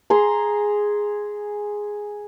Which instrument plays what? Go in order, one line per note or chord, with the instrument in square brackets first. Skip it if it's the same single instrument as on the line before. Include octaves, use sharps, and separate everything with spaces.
[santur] G#4 A#5 C6